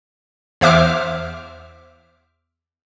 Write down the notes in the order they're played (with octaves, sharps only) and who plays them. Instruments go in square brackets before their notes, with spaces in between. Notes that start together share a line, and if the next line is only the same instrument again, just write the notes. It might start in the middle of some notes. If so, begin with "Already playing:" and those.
[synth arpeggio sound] E2 C5 E5 D6 F6